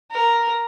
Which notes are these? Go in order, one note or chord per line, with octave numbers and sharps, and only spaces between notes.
A#4